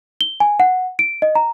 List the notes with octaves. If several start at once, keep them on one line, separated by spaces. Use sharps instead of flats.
G7
G#5
F#5
D7
D#5
A#5